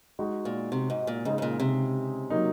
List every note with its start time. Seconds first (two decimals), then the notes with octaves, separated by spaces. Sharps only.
0.19 G#3 D#4 F#4
0.45 A#2
0.72 C3
0.90 G#2
1.07 A#2
1.25 G#2 C#3 G#3 D#4 G#4
1.38 G#2
1.42 A#2
1.60 C3
2.30 F#3 A#3 D#4